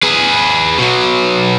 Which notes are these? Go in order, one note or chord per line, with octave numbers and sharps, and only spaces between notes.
G#4 B4
B2 F#3